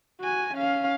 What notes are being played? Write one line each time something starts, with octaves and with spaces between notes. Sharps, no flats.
F#4 G#5
C#4 F5